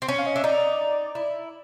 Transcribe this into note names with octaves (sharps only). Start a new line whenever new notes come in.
C4
C#4
F5
D#5
D4 E5
D#4 D5
E4